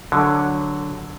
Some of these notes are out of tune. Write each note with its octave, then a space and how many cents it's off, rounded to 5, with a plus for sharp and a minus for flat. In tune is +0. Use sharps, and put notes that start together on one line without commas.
D3 +0 F#3 -5